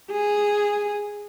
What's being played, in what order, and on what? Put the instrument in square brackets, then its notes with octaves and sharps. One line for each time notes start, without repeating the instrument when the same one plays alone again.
[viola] G#4